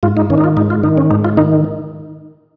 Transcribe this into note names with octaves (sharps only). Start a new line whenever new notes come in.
G#2 F4
D#4
D#3 C#4
D#4
F4
G#2 D#4
F4
D#3 D#4
C#4
G#2 D#4
F4
D#3 D#4